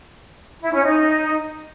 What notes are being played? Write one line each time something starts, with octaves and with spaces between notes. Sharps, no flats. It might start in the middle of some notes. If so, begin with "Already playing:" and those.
E4
C#4
D#4